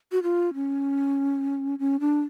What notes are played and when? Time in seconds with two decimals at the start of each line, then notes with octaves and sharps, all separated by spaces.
0.12 F#4
0.23 F4
0.54 C#4
1.79 C#4
2.00 D4